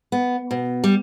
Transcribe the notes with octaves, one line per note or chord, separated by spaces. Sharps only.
B3
B2
G3